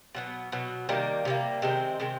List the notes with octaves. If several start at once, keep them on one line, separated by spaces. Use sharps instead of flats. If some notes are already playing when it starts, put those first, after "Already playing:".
B2 F#3 B3
B2 F#3 B3
C3 D#3 G3 A#3
C3 D#3 G3 A#3
C3 D#3 G#3 C4
C3 D#3 G#3 C4